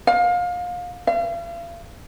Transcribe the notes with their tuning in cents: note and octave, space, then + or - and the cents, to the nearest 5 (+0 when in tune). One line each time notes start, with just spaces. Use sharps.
F5 +25
F5 -40